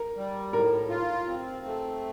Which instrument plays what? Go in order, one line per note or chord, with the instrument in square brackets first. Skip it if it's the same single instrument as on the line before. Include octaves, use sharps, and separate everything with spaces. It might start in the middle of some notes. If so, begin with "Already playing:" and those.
Already playing: [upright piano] A#4
[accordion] G3
[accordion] A2 [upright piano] A#4
[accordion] F4
C4
A3